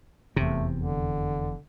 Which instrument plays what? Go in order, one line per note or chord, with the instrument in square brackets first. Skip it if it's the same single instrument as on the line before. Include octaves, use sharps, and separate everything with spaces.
[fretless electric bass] F1 E2 [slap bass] C3 [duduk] A3
[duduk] D3